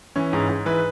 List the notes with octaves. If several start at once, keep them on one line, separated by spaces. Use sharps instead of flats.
E3 C#4
G#2
G#2
E3 B4